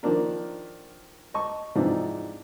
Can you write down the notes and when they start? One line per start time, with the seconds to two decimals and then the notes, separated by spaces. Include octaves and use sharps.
0.03 D#3 F3 A#3 D4 A#4
1.34 D#5 A5 C#6
1.75 G#2 C3 E3 F3 D4 D#4